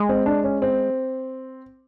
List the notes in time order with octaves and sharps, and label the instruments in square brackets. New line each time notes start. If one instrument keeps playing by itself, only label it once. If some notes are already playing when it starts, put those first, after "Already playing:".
Already playing: [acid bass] G#3
[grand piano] C4
D4
C#4
C4